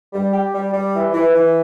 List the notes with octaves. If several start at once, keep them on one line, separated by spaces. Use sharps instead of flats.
G3
G4
G3
G3
E3
E3
E3